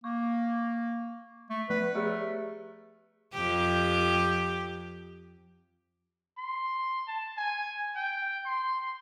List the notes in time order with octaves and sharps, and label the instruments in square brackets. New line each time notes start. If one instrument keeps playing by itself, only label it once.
[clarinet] A#3 [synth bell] C#6
[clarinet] A3
[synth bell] F3 A3 [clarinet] B4
[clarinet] A3 [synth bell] G4 G#4 E5
[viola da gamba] F2 G4
[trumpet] C6
A5
G#5
G5
C6